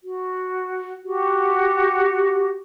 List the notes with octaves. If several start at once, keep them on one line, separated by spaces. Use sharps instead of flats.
F#4
F#4 G4